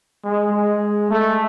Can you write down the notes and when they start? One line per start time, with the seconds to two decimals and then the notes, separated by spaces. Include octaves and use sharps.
0.24 G#3
0.53 G#3
1.11 A3